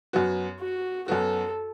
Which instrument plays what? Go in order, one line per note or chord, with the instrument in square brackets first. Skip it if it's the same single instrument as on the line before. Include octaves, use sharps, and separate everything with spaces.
[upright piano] F#2 F#3 B3 F#4
[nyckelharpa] F#4
[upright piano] F#2 F#3 B3 F#4 [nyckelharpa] A4